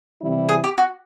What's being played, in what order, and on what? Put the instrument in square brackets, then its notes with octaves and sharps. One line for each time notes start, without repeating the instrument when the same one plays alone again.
[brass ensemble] C3 E3 G3 C4 E4
[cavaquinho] G#4
G4
F#4